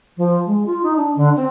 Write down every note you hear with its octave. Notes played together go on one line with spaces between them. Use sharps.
F3
G#3
F4
D#4
D4
D3
C4